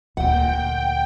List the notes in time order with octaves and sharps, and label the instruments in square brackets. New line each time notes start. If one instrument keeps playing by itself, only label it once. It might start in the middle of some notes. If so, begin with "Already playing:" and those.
[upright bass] D2 A#2 [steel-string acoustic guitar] F#5 [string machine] G5